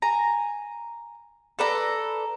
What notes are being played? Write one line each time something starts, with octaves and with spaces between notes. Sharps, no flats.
G#5 A#5
A4 B4 D5 A#5